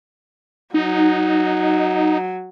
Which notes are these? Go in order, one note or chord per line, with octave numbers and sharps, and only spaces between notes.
F#3 D#4